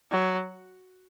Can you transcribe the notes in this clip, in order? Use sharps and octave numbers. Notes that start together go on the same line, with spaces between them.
F#3